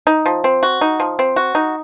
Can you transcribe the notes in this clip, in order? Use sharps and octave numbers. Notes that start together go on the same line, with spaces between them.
D#4
F3
C4
F#4
D#4
F3
C4
F#4
D#4